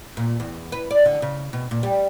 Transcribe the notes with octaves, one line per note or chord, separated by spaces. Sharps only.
A#2
E2
B4
D5
D3
C#3
B2
A#2
G3